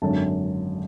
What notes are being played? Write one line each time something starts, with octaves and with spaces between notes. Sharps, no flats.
G#1 F#2 D3 A5